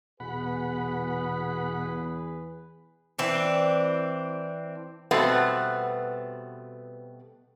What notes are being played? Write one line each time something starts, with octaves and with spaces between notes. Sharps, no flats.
E2 B2 G#4 B4 F#5 B5
E3 C4 D4
B2 G3 A3 B3 C4 F#4